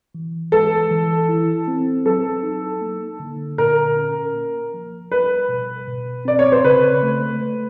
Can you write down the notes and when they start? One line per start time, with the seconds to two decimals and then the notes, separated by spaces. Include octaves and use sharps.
0.15 E3
0.52 G#3 A4
0.91 E3
1.29 E4
1.68 C4
2.06 F#3 A4
2.43 D#4
2.81 A#3
3.20 D3
3.58 A#2 A#4
3.96 C#4
4.35 A#3
4.74 F3
5.11 G3 B4
5.49 B2
5.88 B2
6.25 C4 D5
6.39 C#5
6.52 C5
6.64 C#3 B4
7.03 A3
7.40 A3